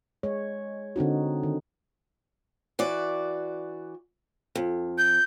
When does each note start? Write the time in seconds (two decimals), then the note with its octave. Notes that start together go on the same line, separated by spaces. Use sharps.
0.23 G#3 C#5
0.96 D3 C4 D#4 F#4
1.43 D#3
2.79 E3 F#4 D5
4.55 F2
4.98 G6